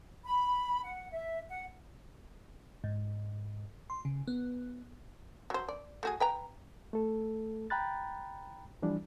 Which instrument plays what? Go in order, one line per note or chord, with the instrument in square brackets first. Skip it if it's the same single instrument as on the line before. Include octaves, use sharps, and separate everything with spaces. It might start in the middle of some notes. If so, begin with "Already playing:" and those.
[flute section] B5
F#5
E5
F#5
[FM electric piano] G#2
C6
C#3
B3
[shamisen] F#3 C5
D5
A3 F#4 G#4
B4 G5 A#5
[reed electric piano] A3 A4
G5 A#5 B5 F#6 A6
E3 F3 G3 D4